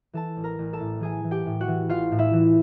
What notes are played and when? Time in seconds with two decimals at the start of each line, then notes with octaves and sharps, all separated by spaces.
0.13 E3 A4 A5
0.37 A1
0.44 A#4 A#5
0.59 A1
0.73 A4 A5
0.80 A2
1.00 E3 G#4 G#5
1.24 E3
1.31 G4 G5
1.46 A2
1.61 F#4 F#5
1.68 E3
1.89 A1 F4 F5
2.12 A2
2.18 E4 E5
2.33 E3